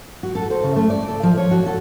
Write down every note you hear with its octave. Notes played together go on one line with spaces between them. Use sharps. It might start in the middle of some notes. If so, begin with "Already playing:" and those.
F#4
A4
C5
C#3
A3
D5
A4
F3
C#5
F#4
A4